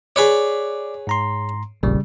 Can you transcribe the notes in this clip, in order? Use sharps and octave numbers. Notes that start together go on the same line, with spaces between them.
G#4 B4 C#5 D5 D6
G#2 A#5 C6
F1 A#1 C#3 G3